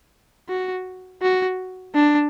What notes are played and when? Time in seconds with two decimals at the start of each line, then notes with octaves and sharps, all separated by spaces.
0.49 F#4
1.22 F#4
1.94 D4